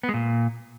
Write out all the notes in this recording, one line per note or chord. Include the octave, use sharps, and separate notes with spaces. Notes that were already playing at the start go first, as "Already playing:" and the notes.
B3
G#3
A#2